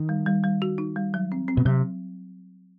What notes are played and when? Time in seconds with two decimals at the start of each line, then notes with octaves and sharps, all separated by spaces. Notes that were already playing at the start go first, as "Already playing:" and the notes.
Already playing: D#3
0.09 G3
0.26 G3
0.44 G3
0.62 F#4
0.78 D#4
0.96 G3
1.14 F#3
1.32 C4
1.48 C4
1.57 B2
1.65 C3 F#3